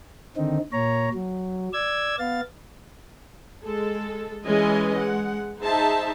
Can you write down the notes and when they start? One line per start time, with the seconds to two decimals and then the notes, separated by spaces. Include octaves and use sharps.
0.37 D3 D#3 C4 D#4
0.72 A#2 C#5 A#5
1.14 F#3
1.73 D5 E6 G#6
2.19 B3 F5 A6
3.63 G#3 A4
4.47 E3 G#3 C#4 D#5 G#5
4.97 G#3 F#5
5.61 D#4 G#4 C5 E5 A5